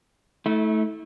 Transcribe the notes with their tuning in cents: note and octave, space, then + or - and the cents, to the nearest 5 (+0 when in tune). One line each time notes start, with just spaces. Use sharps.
A3 -15 E4 -40